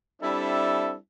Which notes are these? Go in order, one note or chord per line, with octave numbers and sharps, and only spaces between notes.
G3 C4 D4 E4 A4 E5